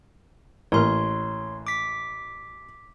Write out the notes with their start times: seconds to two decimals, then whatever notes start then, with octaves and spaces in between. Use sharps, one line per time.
0.72 A1 A#3 C#5 C6 F6
1.67 D6 B6